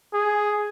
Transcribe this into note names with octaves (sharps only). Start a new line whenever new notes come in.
G#4